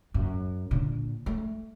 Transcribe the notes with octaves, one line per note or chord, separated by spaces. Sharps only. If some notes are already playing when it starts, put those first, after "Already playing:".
F#2
A#2 D3
A3